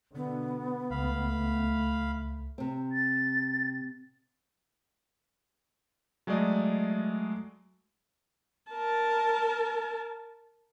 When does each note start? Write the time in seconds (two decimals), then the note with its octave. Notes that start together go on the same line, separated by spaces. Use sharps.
0.15 B2 D3 B3
0.91 C#2 A3 F5 B5
2.58 C3 C4
2.92 A6
6.27 F#3 G#3 A3 D5 D#5
8.72 A#4 A5